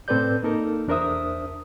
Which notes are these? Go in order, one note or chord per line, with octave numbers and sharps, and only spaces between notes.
A2 C4 A4 B4 D5 G6
A#3 D#4 A4 A#4
E2 D4 A#4 C5 E5 D#6